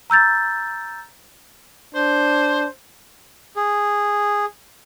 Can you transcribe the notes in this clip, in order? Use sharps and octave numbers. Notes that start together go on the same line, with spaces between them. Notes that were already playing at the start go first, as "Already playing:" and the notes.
A#5 E6 G6 A6
D4 C5
G#4